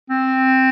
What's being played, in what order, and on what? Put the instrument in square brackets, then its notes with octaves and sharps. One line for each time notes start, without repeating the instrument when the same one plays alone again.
[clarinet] C4